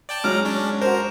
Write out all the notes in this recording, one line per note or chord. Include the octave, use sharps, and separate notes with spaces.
D5 G5 A5
F#3 G#3 A#5 D6 F6
C#4 D4
F#4 A#4 C5